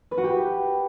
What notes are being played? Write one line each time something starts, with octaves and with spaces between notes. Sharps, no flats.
B4
F#4
G4